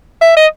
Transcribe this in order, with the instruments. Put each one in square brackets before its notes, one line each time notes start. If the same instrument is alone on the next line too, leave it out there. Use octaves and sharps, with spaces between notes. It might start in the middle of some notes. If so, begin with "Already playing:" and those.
[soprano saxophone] E5
D#5